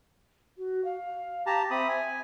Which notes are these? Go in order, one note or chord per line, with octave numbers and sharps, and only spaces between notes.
F#4
F5
G4 A5 A#5
C4 E5 B5 D#6
G#5